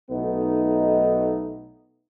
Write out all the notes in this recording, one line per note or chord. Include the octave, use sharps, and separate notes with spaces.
B1 A3 B3 D#4